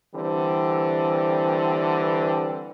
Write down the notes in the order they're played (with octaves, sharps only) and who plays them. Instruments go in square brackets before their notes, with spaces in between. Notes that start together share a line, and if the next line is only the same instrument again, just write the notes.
[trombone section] D3 E3 G3 C4